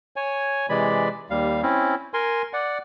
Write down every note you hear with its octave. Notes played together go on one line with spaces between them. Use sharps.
C#5 G#5
C3 E3 G#3 D5 B5
D#2 G3 F5
C4 C#4 E4
A#4 G#5 C6
D5 F#5